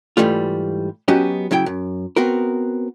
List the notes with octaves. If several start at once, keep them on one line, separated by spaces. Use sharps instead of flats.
G#2 E3 G3 A3 F4
F#3 B3 C#4 F#4 G4 D#5
C#3 F#3 E4 G5
F#2
B3 C4 F#4 A#4